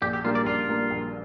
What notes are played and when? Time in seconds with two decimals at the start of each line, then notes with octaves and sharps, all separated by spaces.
0.02 A#1 G4
0.13 G4
0.24 A#2 G3 A#3 D4 F4
0.35 D5
0.46 A#1 F4
0.68 A#2 G3 A#3 D4
0.91 A#1